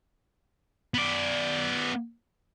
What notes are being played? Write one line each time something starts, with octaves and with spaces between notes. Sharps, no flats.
B3 D5